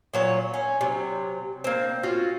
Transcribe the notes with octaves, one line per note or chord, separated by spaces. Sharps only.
A#2 F#3 C#5
C#4
C3 F#3
A#3 C4
C#4 F4 F#4